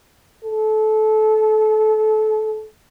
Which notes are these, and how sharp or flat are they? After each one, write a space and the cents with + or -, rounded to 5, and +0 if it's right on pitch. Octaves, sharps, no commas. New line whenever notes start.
A4 -25